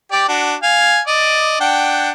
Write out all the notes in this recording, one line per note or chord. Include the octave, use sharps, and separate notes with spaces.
G4 D5
D4 F#4
F5 G#5
D5 D#5
D4 F#5 G5